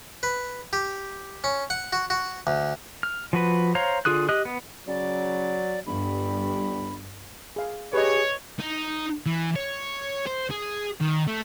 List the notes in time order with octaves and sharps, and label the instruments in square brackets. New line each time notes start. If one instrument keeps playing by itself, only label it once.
[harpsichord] B4
G4
C#4
F#5
F#4
F#4
D2
[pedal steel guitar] F6
F3 F#4 B4
C5 C#5 F5 A#5
D3 F4 G#4 D#6 F#6
G4 D#5 D#6 F#6
B3
[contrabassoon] C#3 [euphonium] F#3 [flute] D5
[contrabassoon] G1 [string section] G2 [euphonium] G3 [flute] B5
[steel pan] G#4 F5
[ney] G4 [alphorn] G#4 [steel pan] B4 D#5 [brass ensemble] C#5
[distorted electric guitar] D#4
E3
C#5
C5
G#4
D#3
A3